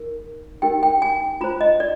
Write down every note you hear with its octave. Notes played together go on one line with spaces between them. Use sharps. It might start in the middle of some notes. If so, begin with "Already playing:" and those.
Already playing: D#4 A#4
D#4 G4 A#4 G5
G5
G#5
F4 C5 A#5
D#5
D5